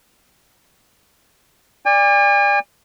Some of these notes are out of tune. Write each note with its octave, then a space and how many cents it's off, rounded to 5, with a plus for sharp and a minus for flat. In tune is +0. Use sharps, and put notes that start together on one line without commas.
D5 +0 G#5 -45